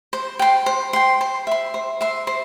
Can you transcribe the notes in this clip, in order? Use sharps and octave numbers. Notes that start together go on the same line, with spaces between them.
C5
G5 C6
C5
G5 C6
C5
E5 C6
C5
E5 C6
C5